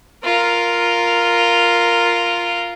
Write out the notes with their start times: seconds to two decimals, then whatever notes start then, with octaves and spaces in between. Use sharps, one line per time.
0.24 F4 A#4